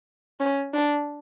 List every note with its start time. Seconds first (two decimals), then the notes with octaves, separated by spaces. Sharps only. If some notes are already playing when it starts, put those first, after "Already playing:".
0.40 C#4
0.74 D4